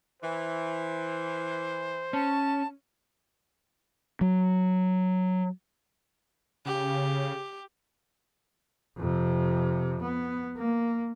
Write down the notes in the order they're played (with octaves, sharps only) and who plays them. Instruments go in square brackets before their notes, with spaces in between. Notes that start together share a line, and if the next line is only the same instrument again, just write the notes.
[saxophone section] E3 [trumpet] C5
[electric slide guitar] C#4 [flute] A5
[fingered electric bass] F#3
[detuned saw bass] C#3 [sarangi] G4
[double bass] F2 C3
B3
A#3